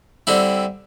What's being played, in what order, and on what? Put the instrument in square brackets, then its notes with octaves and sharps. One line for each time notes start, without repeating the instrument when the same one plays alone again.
[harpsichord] D3 G3 C4 E4